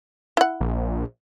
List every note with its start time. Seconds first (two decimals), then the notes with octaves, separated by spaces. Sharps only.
0.37 E4 F#5
0.60 A#1